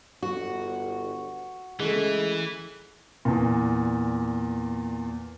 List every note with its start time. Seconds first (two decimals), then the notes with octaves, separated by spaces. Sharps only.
0.23 G1 F#4
1.80 C#3 E3 G#3 A3
3.25 E2 A#2